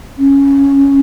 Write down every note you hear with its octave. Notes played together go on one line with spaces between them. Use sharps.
C#4